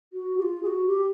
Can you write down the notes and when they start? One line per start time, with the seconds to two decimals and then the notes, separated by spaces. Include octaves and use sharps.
0.13 F#4
0.38 G4
0.42 F4
0.63 G#4
0.66 F#4
0.87 G4